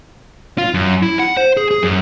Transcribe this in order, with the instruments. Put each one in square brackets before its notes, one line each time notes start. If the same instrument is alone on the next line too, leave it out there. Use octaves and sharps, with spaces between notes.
[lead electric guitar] F4
F#2
E4
F#5
C5
G#4
G#4
F#2